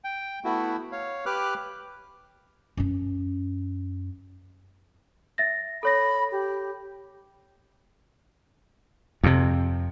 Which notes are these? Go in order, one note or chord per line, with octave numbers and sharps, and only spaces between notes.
G5
A3 B3 E4 F#4
C#5 F5
G4 B4 D6 F6 F#6
F#2 C#4
E5 A6 A#6
A4 C#5 B5 A#6
G4
F2 C3